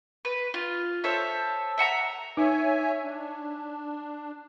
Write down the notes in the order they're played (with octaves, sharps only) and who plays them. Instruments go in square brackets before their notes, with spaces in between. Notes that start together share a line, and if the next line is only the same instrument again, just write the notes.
[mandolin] B4
F4
A4 C5 C#5 E5
E5 F#5 A5 A#5
[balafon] D#4 [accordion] C#5 E5 G#5
[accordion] D4